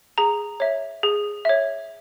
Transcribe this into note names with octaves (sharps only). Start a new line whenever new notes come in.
G#4 A#5
C#5 E5
G#4
C#5 E5